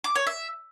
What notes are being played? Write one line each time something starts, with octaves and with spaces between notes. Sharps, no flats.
D6
C#5
E5